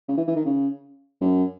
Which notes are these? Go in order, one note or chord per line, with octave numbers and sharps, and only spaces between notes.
C#3
E3
E3
D#3
C#3
F#2